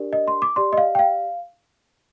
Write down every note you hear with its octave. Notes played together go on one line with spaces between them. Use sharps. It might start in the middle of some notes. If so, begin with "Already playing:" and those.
Already playing: D4 G4 A#4 D5
D#5
C6
D6
G4 D5 C6
D#5
F5
G5
F5